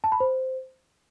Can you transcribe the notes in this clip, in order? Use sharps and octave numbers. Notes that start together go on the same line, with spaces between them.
A5
B5
C5